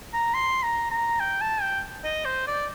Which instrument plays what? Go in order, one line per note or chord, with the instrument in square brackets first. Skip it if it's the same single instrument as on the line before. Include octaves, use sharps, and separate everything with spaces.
[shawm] A#5
C6
A#5
A#5
G5
A5
G5
D#5
C5
D5